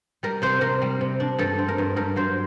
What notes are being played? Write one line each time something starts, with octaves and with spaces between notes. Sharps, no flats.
G3 A#4
C3 C5
C3 A#4
G3
C3
D4
G2 A4
C4
A#4
G2
G2 A#4
F#3 C5